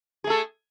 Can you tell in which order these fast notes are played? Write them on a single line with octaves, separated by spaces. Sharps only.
G#4 A3 A4